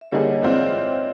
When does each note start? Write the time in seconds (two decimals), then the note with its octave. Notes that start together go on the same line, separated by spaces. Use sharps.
0.01 E5
0.12 D3 G3 A#3 D#4 G#4 C#5 D#5
0.41 E3 G#3 C4 F4 D5 E5